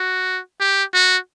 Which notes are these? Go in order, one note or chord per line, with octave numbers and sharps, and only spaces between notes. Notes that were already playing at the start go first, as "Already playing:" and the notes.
Already playing: F#4
G4
F#4